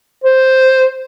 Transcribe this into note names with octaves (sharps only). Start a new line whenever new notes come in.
C5